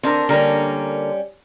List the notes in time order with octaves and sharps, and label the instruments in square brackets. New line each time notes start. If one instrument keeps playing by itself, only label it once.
[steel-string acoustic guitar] D3 [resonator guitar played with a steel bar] C4 D4 A#4
[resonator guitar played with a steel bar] D3 A#3 A#4 [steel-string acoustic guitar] G3 C#4